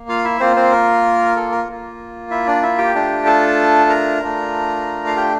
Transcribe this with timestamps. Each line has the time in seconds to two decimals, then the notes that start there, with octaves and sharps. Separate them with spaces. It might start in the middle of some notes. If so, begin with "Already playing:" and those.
Already playing: A#3
0.09 F4 F5
0.24 E4 E5
0.40 A#3 C4 F4 C5
0.56 C4 C5
0.72 A#4
1.36 A4
1.52 A#4
1.68 A#3 F4
2.31 E4 E5
2.47 D4 D5
2.63 E4 E5
2.78 G4 G5
2.95 A3 D4 F4
3.26 A4 A5
3.89 A#4 A#5
4.22 A3 D4 F4
5.07 F5
5.16 G4 G5